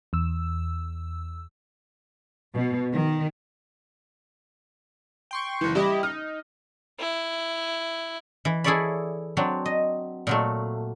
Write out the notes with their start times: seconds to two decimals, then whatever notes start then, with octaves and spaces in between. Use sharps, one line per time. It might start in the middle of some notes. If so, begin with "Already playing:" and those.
0.13 E2 E6
2.55 B2
2.92 D#3
5.31 G5 C6 C#6
5.61 F#1 E3
5.75 G3 E4 G4 D#5
6.03 D#4 F6
6.99 E4
8.45 E3
8.64 E4 G#4 A4 C#5 D5 B5
9.37 F#3 C4 D4
9.66 D#5
10.27 A#2 F#3 A3